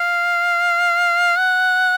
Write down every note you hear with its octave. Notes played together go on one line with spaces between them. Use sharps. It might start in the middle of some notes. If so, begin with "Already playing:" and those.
Already playing: F5
F#5